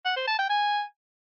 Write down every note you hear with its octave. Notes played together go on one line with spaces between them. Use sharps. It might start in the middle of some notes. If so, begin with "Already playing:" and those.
F#5
C5
A5
G5
G#5